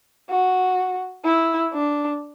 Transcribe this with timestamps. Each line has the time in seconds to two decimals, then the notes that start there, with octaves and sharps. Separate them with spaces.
0.30 F#4
1.25 E4
1.74 D4